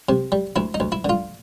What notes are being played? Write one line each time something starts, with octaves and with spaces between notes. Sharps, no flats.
C3
G3
D2 E4
D#4
D2
E4
D3 F4